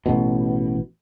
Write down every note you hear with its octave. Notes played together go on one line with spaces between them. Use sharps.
A1 B2